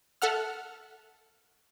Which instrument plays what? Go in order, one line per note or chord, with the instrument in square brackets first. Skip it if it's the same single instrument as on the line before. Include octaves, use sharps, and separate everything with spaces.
[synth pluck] A4 E5 F#5 F6